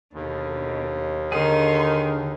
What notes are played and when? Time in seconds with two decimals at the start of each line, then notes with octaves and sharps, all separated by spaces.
0.13 D#2 B2 D3
1.32 D3 D#3 G#4 A#5 C6 C#6